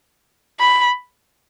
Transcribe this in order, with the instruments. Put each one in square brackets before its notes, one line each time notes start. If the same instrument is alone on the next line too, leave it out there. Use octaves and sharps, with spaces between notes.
[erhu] B5